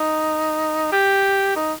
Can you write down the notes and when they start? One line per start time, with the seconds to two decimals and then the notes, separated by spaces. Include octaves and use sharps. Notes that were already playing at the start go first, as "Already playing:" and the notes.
Already playing: D#4
0.92 G4
1.56 D#4